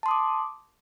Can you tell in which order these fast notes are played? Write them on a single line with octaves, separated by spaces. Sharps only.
A5 C6 D#6 D6